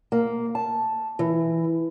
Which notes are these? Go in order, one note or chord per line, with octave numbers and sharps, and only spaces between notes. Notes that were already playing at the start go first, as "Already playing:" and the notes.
A#3
A5
E3